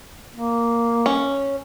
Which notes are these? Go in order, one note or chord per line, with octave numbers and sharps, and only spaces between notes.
A#3
C#4